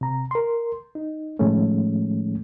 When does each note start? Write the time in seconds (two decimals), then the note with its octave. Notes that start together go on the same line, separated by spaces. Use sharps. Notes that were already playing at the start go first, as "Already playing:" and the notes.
0.01 C3 A#5
0.31 A#4 C6
0.95 D#4
1.39 A2 D#3 F3 G#3 A3 C#4